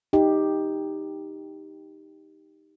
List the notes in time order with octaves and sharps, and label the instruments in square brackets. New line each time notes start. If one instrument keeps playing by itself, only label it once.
[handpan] D#4 G4